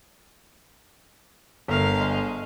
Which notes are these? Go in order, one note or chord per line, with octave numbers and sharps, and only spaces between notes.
G1 A#4 F5
G#3